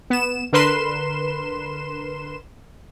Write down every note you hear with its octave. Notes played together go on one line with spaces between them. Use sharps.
B3 E7
D3 A#4 B4 C6 E7